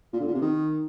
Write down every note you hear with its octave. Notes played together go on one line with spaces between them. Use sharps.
A#2
D3
A#2
C3
D#3